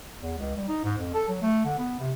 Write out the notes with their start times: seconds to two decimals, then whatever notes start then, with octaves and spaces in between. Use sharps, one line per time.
0.21 E2
0.38 C#2
0.56 G3
0.68 D#4
0.84 G#2
0.98 F2
1.14 A4
1.28 F#3
1.42 A3
1.65 D3
1.78 B3
2.00 C3